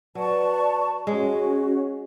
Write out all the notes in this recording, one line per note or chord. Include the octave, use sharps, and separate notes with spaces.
F#3 B4 D5 A5 C#6
G#3 C#4 F#4 C#5